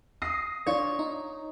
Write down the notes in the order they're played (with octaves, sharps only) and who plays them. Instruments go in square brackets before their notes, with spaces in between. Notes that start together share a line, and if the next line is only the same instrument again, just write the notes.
[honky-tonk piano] D#6 A#6 C7
[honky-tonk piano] D4 [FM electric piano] F4 D5 [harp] C#5
[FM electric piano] D#4